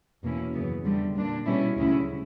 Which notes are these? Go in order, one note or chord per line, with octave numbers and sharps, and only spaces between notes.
E2 B2 A#3 C#4 E4
F#2 C#3 E3 B3
E2 D3 G3
A#2 G3 A#3 D4
B2 G3 C#4 E4
D2 C#3 F#3 C#4 E4